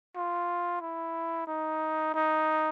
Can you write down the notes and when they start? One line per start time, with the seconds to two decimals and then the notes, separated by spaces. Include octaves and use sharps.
0.16 F4
0.81 E4
1.47 D#4
2.14 D#4